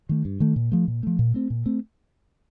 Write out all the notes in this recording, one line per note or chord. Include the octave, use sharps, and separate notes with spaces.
D#3 A3
G2
D#3 A3
A#2
F3 A3
A#2
F3 A3
A#2
A3 C4
A#2
A3 C4